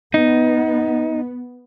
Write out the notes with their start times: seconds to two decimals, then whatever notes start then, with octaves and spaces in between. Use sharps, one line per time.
0.14 B3 D#4